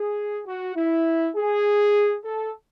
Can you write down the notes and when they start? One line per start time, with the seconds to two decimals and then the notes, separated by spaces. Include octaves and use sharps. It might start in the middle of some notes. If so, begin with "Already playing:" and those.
Already playing: G#4
0.47 F#4
0.76 E4
1.36 G#4
2.25 A4